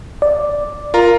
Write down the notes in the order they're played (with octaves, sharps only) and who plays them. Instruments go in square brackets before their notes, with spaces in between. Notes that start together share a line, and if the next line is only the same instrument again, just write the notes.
[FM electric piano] D5
[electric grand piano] F4 A#4 A#5